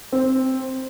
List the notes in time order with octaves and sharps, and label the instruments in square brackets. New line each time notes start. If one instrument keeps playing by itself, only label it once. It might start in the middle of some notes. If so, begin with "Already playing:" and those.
[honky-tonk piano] C4